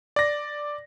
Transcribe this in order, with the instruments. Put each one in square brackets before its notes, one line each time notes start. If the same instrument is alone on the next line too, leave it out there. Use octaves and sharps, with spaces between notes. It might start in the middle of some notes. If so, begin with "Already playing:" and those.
[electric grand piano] D5 A#6